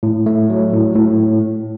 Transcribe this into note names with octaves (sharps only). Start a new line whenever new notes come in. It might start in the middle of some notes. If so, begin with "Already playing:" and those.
A2
A3
F#3
A2
A2